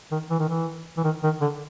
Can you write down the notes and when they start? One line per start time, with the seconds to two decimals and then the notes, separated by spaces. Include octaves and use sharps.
0.12 D#3
0.30 E3
0.39 D#3
0.49 E3
0.97 E3
1.04 D#3
1.24 D#3
1.41 D3